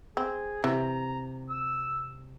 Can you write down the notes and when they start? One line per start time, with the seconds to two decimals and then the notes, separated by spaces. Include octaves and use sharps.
0.17 C4 G#4
0.64 C3 E3 A#5
1.50 E6